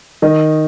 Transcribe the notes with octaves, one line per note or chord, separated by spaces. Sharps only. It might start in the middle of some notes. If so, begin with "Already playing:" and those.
D#3 D#5